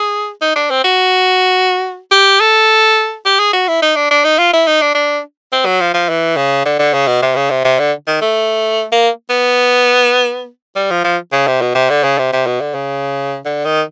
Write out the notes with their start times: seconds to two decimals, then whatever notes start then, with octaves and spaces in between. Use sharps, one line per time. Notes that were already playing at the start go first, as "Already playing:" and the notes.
Already playing: G#4
0.42 D#4
0.56 D4
0.71 C4
0.84 F#4
2.12 G4
2.40 A4
3.26 G4
3.39 G#4
3.54 F#4
3.68 E4
3.82 D#4
3.96 D4
4.11 D4
4.24 D#4
4.38 F4
4.53 E4
4.67 D#4
4.81 D4
4.95 D4
5.53 C4
5.66 F#3
5.81 F3
5.94 F3
6.09 E3
6.37 C#3
6.66 D3
6.79 D3
6.94 C#3
7.07 B2
7.23 C3
7.36 C#3
7.51 C3
7.65 C3
7.79 D3
8.07 D#3
8.22 A3
8.92 A#3
9.30 B3
10.76 G3
10.91 F3
11.04 F3
11.33 C#3
11.47 C3
11.62 B2
11.75 C3
11.90 D3
12.04 C#3
12.18 C3
12.33 C3
12.47 B2
12.61 D3
12.75 C#3
13.45 D3
13.65 D#3